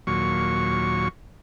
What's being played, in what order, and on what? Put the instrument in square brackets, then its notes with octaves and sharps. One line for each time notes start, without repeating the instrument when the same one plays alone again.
[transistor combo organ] D#2 A#2 F#3 C#6